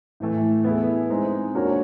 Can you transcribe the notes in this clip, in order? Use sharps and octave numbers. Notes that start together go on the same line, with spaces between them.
A2 E3 A3
B3 E4 G#4
G#3 C4 D#4
A#3 D4 F#4 A#4 C#5